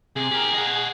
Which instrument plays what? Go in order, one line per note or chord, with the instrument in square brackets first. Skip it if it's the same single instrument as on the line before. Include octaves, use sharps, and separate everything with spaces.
[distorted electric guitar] C3 [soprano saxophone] G#4
[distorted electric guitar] G4 A#4
D#5 F#5